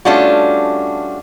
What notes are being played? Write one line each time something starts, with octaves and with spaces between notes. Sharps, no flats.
G3 A3 C#4 D4 F4 F#4